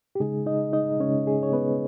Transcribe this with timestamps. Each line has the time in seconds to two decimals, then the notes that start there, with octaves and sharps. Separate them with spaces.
0.15 G4
0.20 C#3 G#3 D#4 G#4
0.46 D#4 D#5
0.73 D#4 D#5
1.00 C#3 G#3 C#4 D#4 C#5
1.27 G#4
1.43 C#5
1.53 B3 B4